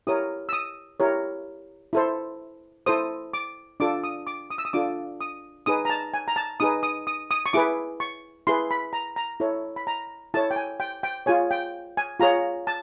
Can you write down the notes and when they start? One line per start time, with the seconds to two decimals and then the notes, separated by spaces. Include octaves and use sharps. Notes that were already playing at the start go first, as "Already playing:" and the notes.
0.07 E4 G4 A#4 C#5 D#6
0.49 E6
0.53 D#6
1.00 E4 G4 A#4 C#5
1.93 E4 A4 C5
2.86 E4 A4 C5 D#6
3.34 D6
3.80 D4 F4 A4 D6
4.04 D#6
4.27 D6
4.50 D#6
4.58 E6
4.65 D#6
4.73 D4 F4 A4 D6
5.21 D#6
5.66 D#4 G#4 B4 D#6
5.85 A#5
5.90 A5
6.14 G#5
6.28 A#5
6.36 A5
6.60 D#4 G#4 B4 D#6
6.83 D#6
7.07 D#6
7.31 D#6
7.46 C#6
7.53 E4 G#4 B4 D6
8.00 C#6
8.47 E4 G#4 B4 C6
8.71 B5
8.93 A#5
9.16 A#5
9.40 E4 A4 C#5
9.76 B5
9.87 A#5
10.34 E4 A4 C#5 A5
10.51 G5
10.56 G#5
10.80 G5
11.03 G5
11.26 F4 G#4 C#5 G#5
11.51 G5
11.97 G#5
12.20 F4 G#4 C#5 A#5
12.67 A5